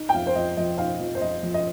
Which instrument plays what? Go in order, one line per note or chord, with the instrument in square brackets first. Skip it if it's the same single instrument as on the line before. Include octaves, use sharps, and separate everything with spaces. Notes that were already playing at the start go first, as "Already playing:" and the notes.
Already playing: [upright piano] D#4
G5
F2 F5
C5
F2 D#5
F3 D#5
D#4 F5
F2
C5
F2 D#5
F3
D#5